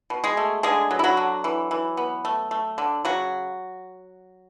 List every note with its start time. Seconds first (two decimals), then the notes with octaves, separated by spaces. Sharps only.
0.10 B2
0.24 G#3 G#4
0.37 A3
0.63 D3 G#3 G#4
0.91 F#3
0.99 E4
1.04 F#3 F#4
1.17 D3
1.44 E3
1.71 E3
1.97 B3
2.25 A3
2.51 A3
2.78 D3
3.05 C#3 F#3 F#4